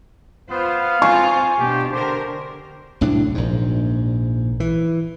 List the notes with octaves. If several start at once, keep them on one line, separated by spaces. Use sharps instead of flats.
B3 F4 C5 F5
C4 F4 C5 G#5 C#6
B2 D4 G4
D3 D4 G4 A#4 C5
C2 A2 F#3 D4
A#1 G#2
E3